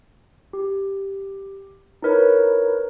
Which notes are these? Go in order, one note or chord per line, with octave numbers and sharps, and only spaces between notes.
G4
D#4 E4 A#4 B4 C#5